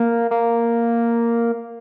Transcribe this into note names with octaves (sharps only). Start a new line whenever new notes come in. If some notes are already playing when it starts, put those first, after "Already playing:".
Already playing: A#3
A#3